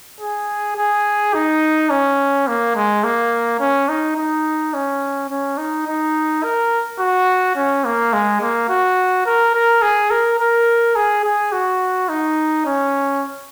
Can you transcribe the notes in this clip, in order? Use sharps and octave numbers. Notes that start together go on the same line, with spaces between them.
G#4
G#4
D#4
C#4
A#3
G#3
A#3
C#4
D#4
D#4
C#4
C#4
D#4
D#4
A#4
F#4
C#4
A#3
G#3
A#3
F#4
A#4
A#4
G#4
A#4
A#4
G#4
G#4
F#4
D#4
C#4